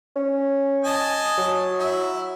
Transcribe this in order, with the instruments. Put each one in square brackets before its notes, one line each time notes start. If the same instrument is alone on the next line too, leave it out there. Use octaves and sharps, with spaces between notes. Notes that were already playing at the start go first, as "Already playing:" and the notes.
[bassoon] C#4
[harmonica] D#5 G#5 A5
[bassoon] F#3
[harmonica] E4